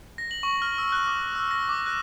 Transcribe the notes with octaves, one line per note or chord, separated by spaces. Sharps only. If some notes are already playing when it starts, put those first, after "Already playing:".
A#6
F#7
C#6
F6
E6
F#6
D6
E6
A#6
D6
F#6